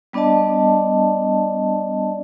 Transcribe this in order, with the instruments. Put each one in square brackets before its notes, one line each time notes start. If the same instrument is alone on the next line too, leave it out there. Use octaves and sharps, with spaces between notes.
[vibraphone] G3 B3 D4 D5 D#5 A5